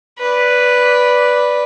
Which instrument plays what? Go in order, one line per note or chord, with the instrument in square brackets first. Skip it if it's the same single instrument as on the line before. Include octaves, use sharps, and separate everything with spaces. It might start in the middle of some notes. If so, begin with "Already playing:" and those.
[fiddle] B4 D5